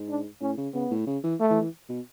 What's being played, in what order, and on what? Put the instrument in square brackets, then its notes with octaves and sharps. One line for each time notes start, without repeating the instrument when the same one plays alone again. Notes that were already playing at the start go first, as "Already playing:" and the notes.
Already playing: [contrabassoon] G#2
[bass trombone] D4
[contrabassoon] A2 [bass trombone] C#4
[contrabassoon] C#3
[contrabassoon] C#3 [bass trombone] B3
[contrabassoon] A2
C#3
E3
[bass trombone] A3
[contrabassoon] E3
E3
B2